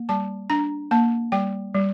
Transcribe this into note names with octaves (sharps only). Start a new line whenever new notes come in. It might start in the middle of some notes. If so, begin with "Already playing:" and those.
Already playing: A#3
G3 A5
D4 A#5
A#3 A5
G3 G5
G3